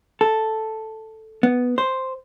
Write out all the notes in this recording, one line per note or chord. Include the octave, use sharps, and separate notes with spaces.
A4
B3
C5